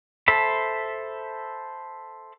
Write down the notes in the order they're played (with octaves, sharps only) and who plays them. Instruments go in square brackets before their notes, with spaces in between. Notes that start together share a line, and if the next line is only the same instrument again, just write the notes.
[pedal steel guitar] A4 C5 E5 A5 B5